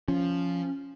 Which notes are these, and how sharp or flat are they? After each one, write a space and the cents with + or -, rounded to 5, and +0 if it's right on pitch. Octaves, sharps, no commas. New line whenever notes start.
F3 +0 C#4 +0